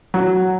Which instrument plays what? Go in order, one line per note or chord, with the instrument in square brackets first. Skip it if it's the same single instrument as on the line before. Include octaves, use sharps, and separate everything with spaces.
[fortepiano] F#3